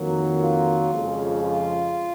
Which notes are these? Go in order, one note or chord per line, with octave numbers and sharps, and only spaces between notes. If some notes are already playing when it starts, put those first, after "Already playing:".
Already playing: F2 D#3 F#3 A#3
F4
F2 C#3 F3 G#3
F4